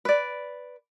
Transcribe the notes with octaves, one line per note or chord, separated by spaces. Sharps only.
B4 D5